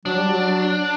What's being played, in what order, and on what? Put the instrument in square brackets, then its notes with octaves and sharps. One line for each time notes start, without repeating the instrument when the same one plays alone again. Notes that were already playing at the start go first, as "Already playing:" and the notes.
[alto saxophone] F#3 [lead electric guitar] D4
[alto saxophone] G3
F#3